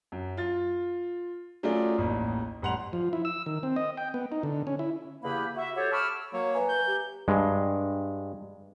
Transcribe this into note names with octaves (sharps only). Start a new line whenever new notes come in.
F#2
F4 A6
F#3 A3 C#4 F4 G#4 D5
A1 D#2
A1 G3 F#5 C6 F7
F3
E4
E6
D#3
C4
D#5
G5
B3
D#4
D3
C#4
E4
E2 C#3 A#3 G4 B4 B5
F#4 E5
F#4 G4 A4 C5 C#5
A5 B5 C#6 D6 E6 F6
F#3 A#3 C#5
B4 E5 G#5 A#5
G6
G4
G2 G#3